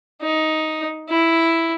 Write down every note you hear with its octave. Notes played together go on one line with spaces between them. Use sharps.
D#4
E4